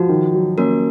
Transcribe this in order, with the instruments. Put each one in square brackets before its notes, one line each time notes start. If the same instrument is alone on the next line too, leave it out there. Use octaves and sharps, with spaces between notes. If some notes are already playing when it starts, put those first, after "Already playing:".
Already playing: [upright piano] F3 [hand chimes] F#4
[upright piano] D#3
F#3
[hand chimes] A#3 A#4 [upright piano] C#4